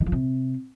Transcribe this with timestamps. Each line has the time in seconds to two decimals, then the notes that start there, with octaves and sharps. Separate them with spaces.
0.01 D#3
0.06 F3
0.12 C3